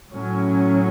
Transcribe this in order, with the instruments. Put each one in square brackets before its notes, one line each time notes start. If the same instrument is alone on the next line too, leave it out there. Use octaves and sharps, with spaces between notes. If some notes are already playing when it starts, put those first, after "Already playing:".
[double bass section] A2 F#3 C#4